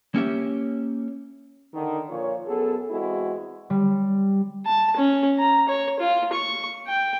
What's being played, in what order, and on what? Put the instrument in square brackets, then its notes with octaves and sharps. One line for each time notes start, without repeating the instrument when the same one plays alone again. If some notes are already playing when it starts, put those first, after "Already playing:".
[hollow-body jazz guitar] A#3 C#4 G4 E5
[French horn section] D3 D#3
A#2 F3 F4 C#5
F#2 B3 G#4 A4
E2 G#3 C4 E4 F#4
[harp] G3
[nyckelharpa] A5
C#4
A#5
C#5
F4
C#6
G5